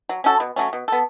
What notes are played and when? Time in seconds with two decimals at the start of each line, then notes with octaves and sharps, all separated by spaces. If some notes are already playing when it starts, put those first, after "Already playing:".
0.09 F#3
0.24 C#4 F#4 A4
0.40 B2
0.56 F#3 A3 C#4
0.73 B2
0.88 B3 A4